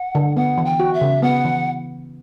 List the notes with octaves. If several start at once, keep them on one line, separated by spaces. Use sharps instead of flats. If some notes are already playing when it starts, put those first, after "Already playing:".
Already playing: F#5
D3
B3 F#5
E3
G5
F#4
E5
C#3
B3 F#5
E3